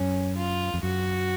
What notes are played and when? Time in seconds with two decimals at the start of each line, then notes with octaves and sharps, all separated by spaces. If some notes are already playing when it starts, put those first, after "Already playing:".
Already playing: F#2 C#4
0.36 F4
0.74 F2
0.83 F#2 F#4